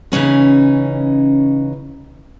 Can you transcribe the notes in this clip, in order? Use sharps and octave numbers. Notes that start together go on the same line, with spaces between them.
C#3 E3 C#4 D#4